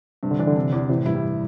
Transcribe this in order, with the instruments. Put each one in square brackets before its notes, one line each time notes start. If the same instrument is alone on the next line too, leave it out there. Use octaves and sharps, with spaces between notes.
[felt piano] G2 [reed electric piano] C3
[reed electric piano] D3
[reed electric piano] E3 [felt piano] D4
[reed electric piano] D3
[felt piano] C3
E2
[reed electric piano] C3 [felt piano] E3
[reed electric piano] A2
[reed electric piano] G2 [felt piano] E4
[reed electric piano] G3